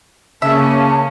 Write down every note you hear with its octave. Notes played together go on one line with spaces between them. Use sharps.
C#3 A#3 C#4 E5 A5